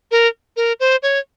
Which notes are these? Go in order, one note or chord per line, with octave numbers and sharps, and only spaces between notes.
A#4
A#4
C5
C#5